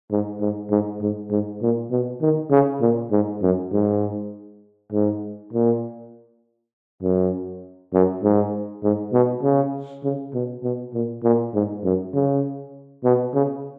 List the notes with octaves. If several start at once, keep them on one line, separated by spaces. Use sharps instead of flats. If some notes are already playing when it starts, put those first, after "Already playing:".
G#2
G#2
G#2
G#2
G#2
A#2
B2
D#3
C#3
A#2
G#2
F#2
G#2
G#2
A#2
F#2
F#2
G#2
G#2
B2
C#3
C#3
B2
B2
A#2
A#2
G#2
F#2
C#3
B2
C#3